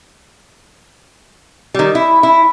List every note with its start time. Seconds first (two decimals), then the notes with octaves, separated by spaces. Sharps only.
1.74 D#3 G3
1.95 E4
2.23 E4